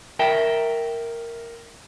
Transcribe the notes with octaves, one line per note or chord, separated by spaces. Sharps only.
A#4 E5 G5